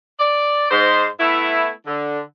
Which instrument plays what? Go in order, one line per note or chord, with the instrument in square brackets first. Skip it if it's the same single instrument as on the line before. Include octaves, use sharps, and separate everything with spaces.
[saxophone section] D5
G#2 C5
A3 B3 E4
D3